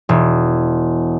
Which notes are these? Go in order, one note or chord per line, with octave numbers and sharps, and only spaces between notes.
E1